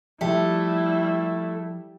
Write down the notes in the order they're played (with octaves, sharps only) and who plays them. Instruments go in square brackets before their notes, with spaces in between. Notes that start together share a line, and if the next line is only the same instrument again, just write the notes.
[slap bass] F3 [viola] G3 E4 [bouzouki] A3 [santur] G4